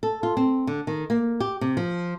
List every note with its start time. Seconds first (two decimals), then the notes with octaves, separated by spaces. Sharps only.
0.03 A4
0.23 F4
0.37 C4
0.67 D3
0.87 D#3
1.10 A#3
1.40 G4
1.61 C3
1.77 F3